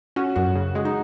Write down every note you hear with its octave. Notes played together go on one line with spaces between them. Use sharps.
C#4 F#4
F#2 F#4
C#3
G#3 G#4
D#4